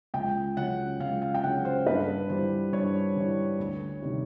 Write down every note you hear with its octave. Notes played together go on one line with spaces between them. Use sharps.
C#2 G5
C#3 F#3 F#5
C#2 F5
F5
G5
C#3 F#3 F#5
C5
G2 B4
E3 G3 C5
G2 C#5
E3 G3
D2
C3 D#3 G3